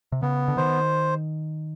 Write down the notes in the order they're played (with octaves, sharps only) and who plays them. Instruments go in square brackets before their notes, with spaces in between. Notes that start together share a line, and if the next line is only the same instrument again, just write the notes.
[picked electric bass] C3
[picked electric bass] C#3 [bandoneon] B3
[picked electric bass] D3
[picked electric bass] D#3 [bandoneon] C5